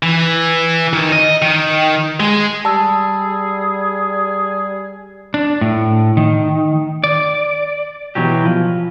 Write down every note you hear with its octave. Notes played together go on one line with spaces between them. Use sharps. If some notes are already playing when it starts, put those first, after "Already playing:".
E3
D#3
D#5
D#3
G#3
G3 G#4 A5 E6
D4
A2
D#3
D5
B2 E3 F#3 G4
F3